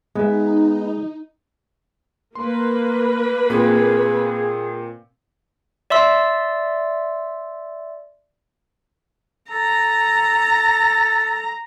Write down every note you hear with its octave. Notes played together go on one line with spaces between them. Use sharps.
G#3 B3 D#4 E5
A#3 B4 C6
A#2 C4 G#4
D5 E5 C6 E6
A4 A#5